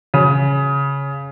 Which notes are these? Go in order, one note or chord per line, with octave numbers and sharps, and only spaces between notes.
C#3